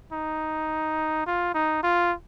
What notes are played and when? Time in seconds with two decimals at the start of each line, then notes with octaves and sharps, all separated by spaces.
0.13 D#4
1.27 F4
1.54 D#4
1.83 F4